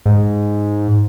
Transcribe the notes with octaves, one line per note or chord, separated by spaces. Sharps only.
G#2